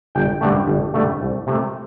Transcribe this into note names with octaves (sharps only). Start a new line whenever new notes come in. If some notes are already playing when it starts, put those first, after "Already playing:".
G1 G5
G2 D3 A3
G1
G2 D3 A3
C2
C3 A3